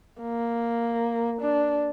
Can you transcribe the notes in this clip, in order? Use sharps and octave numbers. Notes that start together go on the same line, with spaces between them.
A#3
D4